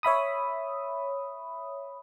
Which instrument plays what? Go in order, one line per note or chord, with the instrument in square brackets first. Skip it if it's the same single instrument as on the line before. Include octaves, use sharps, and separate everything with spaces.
[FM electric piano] C#5 E5 B5 D#6